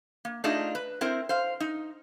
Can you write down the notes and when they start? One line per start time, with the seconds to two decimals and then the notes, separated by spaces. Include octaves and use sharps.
0.25 A#3
0.44 A3 D4 D#4 F4 G#4 D#5
0.75 B4
1.01 C4 E4 A#4 C5
1.29 C5 F5
1.60 D#4